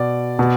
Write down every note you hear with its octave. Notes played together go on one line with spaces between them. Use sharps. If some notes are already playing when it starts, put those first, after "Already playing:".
Already playing: B2 D5
B2